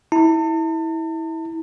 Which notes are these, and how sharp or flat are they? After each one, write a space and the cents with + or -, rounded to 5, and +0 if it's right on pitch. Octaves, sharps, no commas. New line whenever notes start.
E4 -25 A5 +40